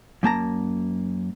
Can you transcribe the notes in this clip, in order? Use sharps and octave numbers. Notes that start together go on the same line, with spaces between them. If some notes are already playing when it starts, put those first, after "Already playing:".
F#2 A#3 A5 A#5